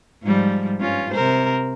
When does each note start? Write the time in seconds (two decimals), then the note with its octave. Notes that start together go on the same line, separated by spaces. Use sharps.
0.23 G#2 F3 G3
0.80 G2 C#4 F4
1.12 C3 A#4 C5